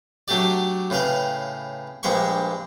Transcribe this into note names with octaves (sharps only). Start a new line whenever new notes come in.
F#3 A3 D4 G4 D5
A2 C#3 B4 F5 G5
A#1 G2 G#3 G5 B5 C#6